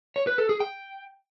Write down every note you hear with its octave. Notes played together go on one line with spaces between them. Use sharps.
C#5
B4
A4
G#4
G5